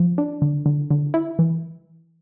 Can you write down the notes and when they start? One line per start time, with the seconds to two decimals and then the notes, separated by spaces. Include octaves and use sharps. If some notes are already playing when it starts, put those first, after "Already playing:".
Already playing: F3
0.18 D4
0.42 D3
0.66 D3
0.91 D3
1.14 E4
1.39 E3